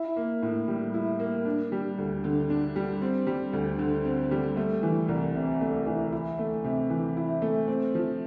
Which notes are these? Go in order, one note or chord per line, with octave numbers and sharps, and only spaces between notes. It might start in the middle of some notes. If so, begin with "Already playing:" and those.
Already playing: E4
A#3
A2
G3
E4
A#3
D4
G3
D2
D3
D4
G3
C4
G3
D2
D3
C4
G3
A3
E3
C2
C3
A3
E3
E4
A3
C3
E3
E4
A3
C4
F3